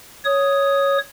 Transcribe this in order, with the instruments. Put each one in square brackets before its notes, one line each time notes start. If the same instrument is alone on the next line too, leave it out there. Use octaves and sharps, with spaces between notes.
[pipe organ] C#5 D#6